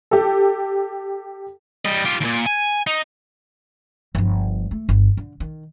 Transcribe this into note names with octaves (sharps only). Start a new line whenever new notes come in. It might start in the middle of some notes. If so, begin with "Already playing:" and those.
G4 A4
G3 D#5
F4 G4
D#2 A#2
G#5
D#4
G1 F3
A3
G1
D3
D#3